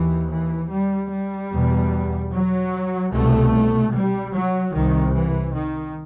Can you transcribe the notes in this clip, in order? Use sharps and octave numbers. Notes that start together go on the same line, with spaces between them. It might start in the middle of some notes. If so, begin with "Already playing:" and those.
Already playing: D#2 E3
E3
G3
G3
E2 B2
F#3
C2 B2 A3
G3
F#3
C2 C3 D#3
E3
D#3